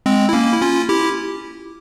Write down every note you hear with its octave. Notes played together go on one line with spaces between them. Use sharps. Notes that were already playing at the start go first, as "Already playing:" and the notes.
G#3 C4
E4
A#3 C#4
E4
C#4 F4
E4 G4